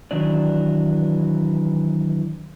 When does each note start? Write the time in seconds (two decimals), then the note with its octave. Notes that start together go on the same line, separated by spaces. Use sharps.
0.11 D#3 E3 F#3 D4 D5